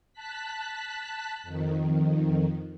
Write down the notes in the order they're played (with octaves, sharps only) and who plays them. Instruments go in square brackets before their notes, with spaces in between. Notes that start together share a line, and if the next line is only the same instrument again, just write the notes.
[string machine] A5 F#6 B6
F2 D#3